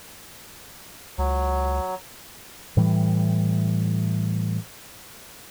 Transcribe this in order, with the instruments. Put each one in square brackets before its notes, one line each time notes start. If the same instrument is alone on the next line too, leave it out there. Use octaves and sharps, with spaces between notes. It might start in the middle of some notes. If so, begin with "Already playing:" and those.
[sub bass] C#2 [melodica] F#3
[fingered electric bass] A2 E3 G3